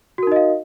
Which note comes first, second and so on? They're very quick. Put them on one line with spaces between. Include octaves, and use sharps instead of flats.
F#4 A#4 D#4 D#5 F5